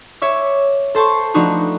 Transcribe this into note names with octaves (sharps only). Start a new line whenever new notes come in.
C#5 E5 D6
A4 C5 A5 C6 C#6
F3 A3 D4 D#4 F#4 B4